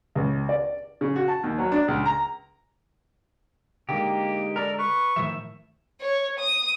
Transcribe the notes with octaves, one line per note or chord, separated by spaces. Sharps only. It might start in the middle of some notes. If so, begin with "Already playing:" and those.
C#2
D5
C#3
F#4
A5
D#2
F#3
D4
C#2
A#5
D3 G#3 A#3 D#4 G4
A4 A#4 D5
B4 C#6
A2 D#3 F3 E5
C#5
D#6